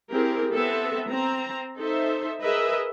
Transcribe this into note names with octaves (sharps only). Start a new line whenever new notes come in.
C4 E4 G4 G#4 A#4
B3 C4 A4 E5
C4 A#5
D#4 A4 C5 E5
G#4 A#4 B4 D#5 E5